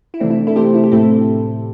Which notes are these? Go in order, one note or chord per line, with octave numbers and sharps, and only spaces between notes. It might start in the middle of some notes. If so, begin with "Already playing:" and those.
E4
C3 E3 A3 C4 D4
E4
E4 A4
C3 A3 C4 G4 C5
E4
G4
A2 A3 C4 E4 A4